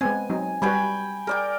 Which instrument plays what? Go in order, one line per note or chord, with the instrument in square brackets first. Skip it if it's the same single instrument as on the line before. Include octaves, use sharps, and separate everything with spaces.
[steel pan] G#3 B3 C4 [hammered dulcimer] G#5
[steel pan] F#3 C4 D#4
[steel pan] G3 F#4 B4 [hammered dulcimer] G5 G#5 B5
[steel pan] G#4 [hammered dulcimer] A#4 D5 G5